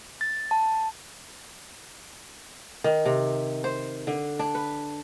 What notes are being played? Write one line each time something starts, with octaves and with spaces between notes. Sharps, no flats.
A6
A5
D#3
C3
C5
D3
D4
B4